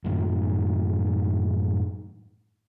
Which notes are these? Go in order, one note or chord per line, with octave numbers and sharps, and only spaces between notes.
F#2 A2 D#3